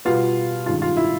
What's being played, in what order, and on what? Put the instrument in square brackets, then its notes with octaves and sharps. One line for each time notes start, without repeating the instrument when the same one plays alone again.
[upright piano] B2 G3 B3 F4
G2 D#3 G#3 C#4 F4
F4
E4